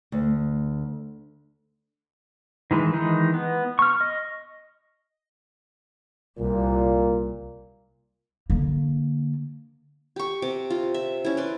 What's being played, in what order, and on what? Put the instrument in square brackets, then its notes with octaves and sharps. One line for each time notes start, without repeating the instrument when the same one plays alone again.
[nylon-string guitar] D2
[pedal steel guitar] D#3 E3 G#3
D#3 E3 G#3 D#4
B3
C#6 F6
D#5
[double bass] C2 [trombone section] A#2
[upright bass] D3 A#3
[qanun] G4 C#6
C3 D6
F4
E5
C#4 E4
B4 D5 C6